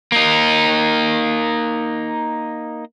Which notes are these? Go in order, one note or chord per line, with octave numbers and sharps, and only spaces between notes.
A#3 D#4